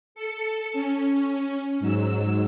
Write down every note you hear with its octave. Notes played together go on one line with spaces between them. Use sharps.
A4 C#7
C#4
G#2 F#3 E6